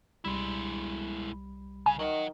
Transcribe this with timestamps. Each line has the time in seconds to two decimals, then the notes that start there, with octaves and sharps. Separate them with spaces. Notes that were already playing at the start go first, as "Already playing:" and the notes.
0.24 C2 G3 G#3 E4 B5
1.86 C#3 G#5
1.99 D#3 F#3 F#5